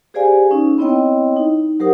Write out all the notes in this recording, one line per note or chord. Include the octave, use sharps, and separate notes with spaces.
G4 G#4 C5 D5 F5 G#5
C#4 D#4
B3 C4 E4 C#5 D#5 G5
D#4
F#3 G4 A#4 C5 F#5 D#6